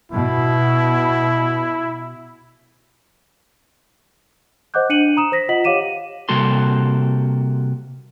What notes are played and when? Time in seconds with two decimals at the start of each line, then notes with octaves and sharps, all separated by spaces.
0.12 B2 E4
4.74 C5 D#5 F#5 D6 F#6 G6
4.89 D4 C#7 D#7 F#7
5.17 A#5 D#6 E7
5.32 C5 A#6 B6
5.49 F4 D#5 F#5 B6 F#7
5.64 G4 C#5 F5 D6 D#7 E7
6.29 C3 G3 A#3 F#4 A4 C6